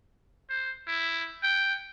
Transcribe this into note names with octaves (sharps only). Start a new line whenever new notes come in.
C5
E4
G5